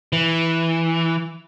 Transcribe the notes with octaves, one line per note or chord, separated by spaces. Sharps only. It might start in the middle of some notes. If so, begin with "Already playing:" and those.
E3